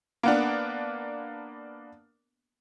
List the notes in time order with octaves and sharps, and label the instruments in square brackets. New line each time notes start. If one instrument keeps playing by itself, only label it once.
[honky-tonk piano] A#3 B3 D4